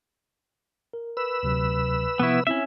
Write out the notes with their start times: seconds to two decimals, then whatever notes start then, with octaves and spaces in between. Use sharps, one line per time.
0.93 A#4
1.17 B4 E6
1.43 D2 C3 F#3
2.20 C3 F3 B3 E4 C#6
2.47 C4 C#4 E4 E5